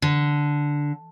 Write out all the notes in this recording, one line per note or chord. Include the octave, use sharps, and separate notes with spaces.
D3